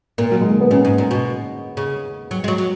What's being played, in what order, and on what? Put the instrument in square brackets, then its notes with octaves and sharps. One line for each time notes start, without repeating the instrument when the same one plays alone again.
[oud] A#2 [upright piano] A#3
[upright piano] F#3
G#3
A#3
B3
[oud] A#2 [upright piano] C#4
[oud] G#2
A#2
B2
C#3
F#3
G#3
F#3
F#3